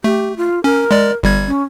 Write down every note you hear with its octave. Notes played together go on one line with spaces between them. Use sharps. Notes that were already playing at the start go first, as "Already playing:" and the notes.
A3 G4
F4
C#4 A#4
G#3 D5
G1 G3 G#6
C#4